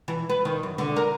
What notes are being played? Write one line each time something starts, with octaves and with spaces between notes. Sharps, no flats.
E3
B4
D#3
F#2
D3
A#4